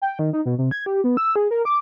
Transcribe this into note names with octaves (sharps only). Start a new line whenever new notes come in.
G5
D#3
D#4
B2
C3
G#6
G4
B3
E6
G#4
A#4
D6